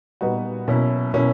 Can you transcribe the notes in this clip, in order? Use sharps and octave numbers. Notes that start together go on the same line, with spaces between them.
A#2 G3 B3 D#4 F#4
B2 F#3 A#3 C#4 E4
B2 F#3 A#3 C#4 E4